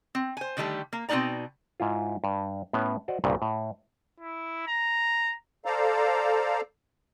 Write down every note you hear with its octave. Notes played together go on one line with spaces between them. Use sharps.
C4
C5 G#5
D3 D#3 G3 A3 G4
A#3
B2 C4 D4 D#4 D5 A#5
G#2 E4 F4
G2
A2 B3 C#4
F#4 C5 D5 D#5 F#5
C2 G2 A#2 C#3
A2
E4
A#5
A4 C5 D5 F5 A#5